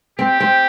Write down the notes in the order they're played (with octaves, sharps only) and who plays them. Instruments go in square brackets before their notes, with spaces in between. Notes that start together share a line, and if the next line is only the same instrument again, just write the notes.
[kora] C4 [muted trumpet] G4
[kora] C4